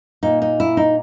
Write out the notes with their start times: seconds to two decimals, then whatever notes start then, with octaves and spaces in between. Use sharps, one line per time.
0.23 A#2 D#4
0.42 D#4
0.60 E4
0.77 D#4